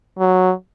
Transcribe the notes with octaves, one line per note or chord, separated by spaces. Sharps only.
F#3